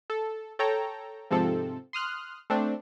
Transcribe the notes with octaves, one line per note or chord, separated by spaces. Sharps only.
A4
A4 C#5 G5 A#5
G#2 C3 F3 C4 A4
C6 D#6 F6 F#6
A3 C4 D4